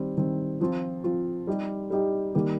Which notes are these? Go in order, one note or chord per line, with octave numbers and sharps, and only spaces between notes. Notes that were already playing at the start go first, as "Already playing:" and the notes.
Already playing: D#3 G3 C4
D#3 G3 C4
F3 C4 F4
F3 C4 F4
G3 D#4 G4
G3 D#4 G4
D#3 G3 A#3 G4